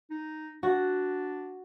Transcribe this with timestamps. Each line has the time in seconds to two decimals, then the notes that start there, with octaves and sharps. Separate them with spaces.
0.10 D#4
0.63 D4 F#4